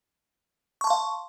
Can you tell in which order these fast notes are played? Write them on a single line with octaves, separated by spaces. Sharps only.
C#6 A5 C6 F5